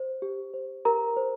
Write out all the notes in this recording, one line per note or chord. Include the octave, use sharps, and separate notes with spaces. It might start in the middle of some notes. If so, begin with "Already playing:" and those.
Already playing: C5
G4
C5
G4 A#4 A#5
C5